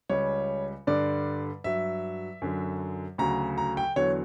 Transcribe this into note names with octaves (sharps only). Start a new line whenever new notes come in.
C#2 C#3 G3 C#5
G2 D3 G3 D5
G2 F#3 E5
F#2 D3 F#3
D2 C#3 F#3 A#5
A#5
G5
E2 D3 F#3 C#5